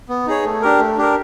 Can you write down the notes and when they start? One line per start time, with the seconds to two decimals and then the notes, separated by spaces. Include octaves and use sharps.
0.09 B3
0.26 D#4 G#4 C#5
0.45 A3
0.62 D4 G4 A#4
0.79 A3
0.98 D4 G4 A#4